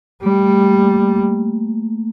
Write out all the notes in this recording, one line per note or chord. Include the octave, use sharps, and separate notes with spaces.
G3 A3
A3
A#3